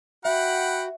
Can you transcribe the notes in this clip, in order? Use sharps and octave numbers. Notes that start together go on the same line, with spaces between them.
F#4 E5 F#5 G5 B5